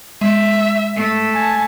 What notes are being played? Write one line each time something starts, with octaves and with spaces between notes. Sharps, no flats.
G#3 E5
A3
G#5 A5